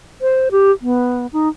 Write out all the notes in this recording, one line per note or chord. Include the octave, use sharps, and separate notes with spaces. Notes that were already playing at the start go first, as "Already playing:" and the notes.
C5
G4
B3
D#4